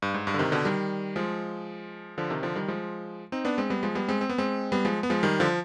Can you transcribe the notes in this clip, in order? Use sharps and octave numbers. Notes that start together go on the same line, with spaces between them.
G2
G#2
G2
D3
C3 D#3
B2 D3
D#3 G3
F3 G#3
D3 F3
C3 D#3
D3 F3
D#3 G3
F3 G#3
C4 D#4
B3 D4
G#3 C4
G3 B3
F3 G#3
G3 B3
G#3 C4
C4
B3
G#3 C4
G3 B3
F3 G#3
B3
F3 G#3
D#3 G3
D3 F3